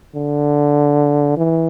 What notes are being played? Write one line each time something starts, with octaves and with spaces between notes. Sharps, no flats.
D3
E3